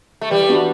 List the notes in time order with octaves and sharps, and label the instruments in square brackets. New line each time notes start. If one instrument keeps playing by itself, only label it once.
[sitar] A3
[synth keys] E3 [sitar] G3
[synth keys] B3 D4 F#4